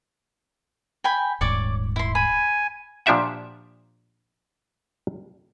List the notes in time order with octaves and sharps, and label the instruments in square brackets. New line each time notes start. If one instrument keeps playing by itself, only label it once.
[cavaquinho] G5 G#5 B5
[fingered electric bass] D#1 G#2 [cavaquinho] C#5 D5 D6
[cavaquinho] E4 C6
[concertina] G#5 [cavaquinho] B5
[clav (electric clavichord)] A#2 F3 D4 G4 E5 F#5